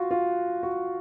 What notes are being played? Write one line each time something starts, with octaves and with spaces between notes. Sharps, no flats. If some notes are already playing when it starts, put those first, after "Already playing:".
Already playing: F4 F#4
F4
F#4